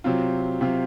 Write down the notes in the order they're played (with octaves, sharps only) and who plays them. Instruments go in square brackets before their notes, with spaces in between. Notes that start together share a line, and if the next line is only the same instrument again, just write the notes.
[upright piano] C3 F#3 C4 F4
C3 F#3 C4 F4